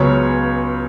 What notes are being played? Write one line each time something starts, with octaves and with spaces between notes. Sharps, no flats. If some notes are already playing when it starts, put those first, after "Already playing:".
Already playing: C#2 C#3 F#3 B3 C#5